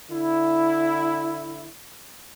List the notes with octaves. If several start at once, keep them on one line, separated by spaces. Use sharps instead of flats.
D3 E4